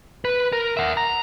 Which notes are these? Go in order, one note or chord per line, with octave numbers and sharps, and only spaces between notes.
B4
A#4
E5 F#5
A#5